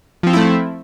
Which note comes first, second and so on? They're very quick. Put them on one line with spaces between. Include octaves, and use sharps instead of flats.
F3 C4 F4 E4 A3